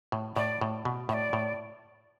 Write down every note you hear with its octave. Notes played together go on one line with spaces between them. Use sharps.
A2
A2 D5
A2
B2
A2 D5 E5
A2